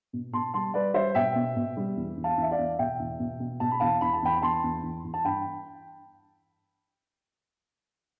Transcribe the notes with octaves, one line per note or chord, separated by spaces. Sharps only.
B2
B2 A5 C6
G3 A5 C6
G3 B4 D5
G3 C5 E5
B2 E5 G5
B2
B2
G3
E2
E2
F5 A5
E2 E5
D5 F5
E2
B2 E5 G5
E2
B2
B2
B2 A5
B5
E2 F5 A5
E2 B5
A5
E2 G5 B5
B5
E2 A5 C6
E2
E2
E2
A5
G2 G5 B5